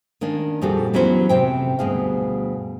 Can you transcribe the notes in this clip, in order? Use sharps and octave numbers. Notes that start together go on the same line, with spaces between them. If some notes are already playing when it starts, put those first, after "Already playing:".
D#3 A#3 C#4 D4
F2 A#2 G3 F#4 G#4 A4
E3 F#3 B3 C#4 B4 C5
F2 C3 C4 G5
D2 G2 B2 G#4 F5